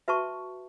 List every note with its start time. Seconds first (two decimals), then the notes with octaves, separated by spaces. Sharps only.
0.08 F#4 B4 E5 A5 C#6